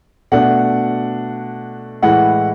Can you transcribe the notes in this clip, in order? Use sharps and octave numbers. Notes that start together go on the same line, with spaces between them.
B2 A3 D4 F#5
A2 E3 G#3 F#5